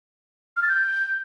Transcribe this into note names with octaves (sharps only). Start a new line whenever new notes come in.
F6
A6
G6